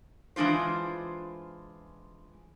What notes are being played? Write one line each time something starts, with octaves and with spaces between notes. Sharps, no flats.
E3 G#3 D4 F4 C5